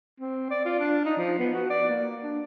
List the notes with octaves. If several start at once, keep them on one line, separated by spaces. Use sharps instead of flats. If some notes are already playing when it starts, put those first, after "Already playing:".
C4
D5
F4
D4
D#4
F3
B3
F#4
D5
A#3
D4